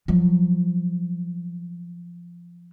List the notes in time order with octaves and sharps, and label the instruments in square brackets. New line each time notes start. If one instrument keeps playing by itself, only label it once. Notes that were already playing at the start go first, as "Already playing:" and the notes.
[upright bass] F3 F#3